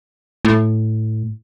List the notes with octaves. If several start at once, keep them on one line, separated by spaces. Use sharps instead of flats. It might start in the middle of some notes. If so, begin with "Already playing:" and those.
A2